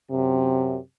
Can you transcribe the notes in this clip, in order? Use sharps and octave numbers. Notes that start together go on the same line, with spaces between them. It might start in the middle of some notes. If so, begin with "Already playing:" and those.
F#2 C3